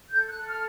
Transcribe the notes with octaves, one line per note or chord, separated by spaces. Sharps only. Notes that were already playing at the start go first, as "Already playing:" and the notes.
A4 G6
G6
F#6
A4
F6